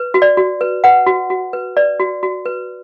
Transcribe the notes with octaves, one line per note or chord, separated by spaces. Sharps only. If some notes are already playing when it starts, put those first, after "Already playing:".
Already playing: B4
F#4
D5
F#4
B4
B4 F#5
F#4
F#4
B4
B4 D5
F#4
F#4
B4